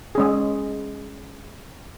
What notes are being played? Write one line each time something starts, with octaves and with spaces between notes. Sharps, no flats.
G#3 C#4 G#4